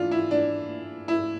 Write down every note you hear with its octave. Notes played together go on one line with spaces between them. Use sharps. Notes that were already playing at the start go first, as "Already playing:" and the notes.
Already playing: E3 D4 F4
E4
D4
E4